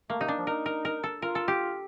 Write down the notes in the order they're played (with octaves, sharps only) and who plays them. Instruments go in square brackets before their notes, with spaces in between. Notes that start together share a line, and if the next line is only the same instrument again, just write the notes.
[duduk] A3 [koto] A#3
[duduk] C3 [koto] D#4
[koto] D4
[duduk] F3
[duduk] D#4 [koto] A#4
[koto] A#4
A#4
A4
[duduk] F4 [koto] A#4
[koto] A4
G4